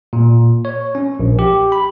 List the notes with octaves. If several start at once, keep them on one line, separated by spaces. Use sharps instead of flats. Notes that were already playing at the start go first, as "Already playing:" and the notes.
A#2
C#5
C#4
A#1
G4
B5